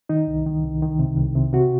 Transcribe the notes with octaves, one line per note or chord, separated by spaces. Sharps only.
D#3 D#4
C2
D#3
C2
D#3
C3
C2
C3
C3 F#4